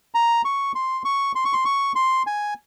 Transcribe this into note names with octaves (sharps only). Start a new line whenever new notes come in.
A#5
C#6
C6
C#6
C6
C#6
C6
C#6
C6
G#5